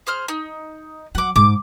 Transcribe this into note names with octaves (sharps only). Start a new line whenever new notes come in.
G#4 C5 F6
D#4
F#3 F#5 D6
G#2 D6